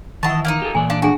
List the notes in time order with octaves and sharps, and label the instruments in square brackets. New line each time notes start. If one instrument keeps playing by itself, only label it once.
[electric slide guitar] D#3 E3 E4 [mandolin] D#5 A5 [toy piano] F#5 B5 C#6
[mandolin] A#3 D4 D#4
[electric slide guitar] G4 A4
[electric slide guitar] A#2 E3 D5 [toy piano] G#5
[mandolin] D4 [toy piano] F5
[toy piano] D4 G#4 [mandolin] F#4